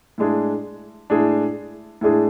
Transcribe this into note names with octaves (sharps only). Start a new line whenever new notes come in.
A2 G#3 D4 G#4
A2 G#3 D4 G#4
A2 G#3 D4 G#4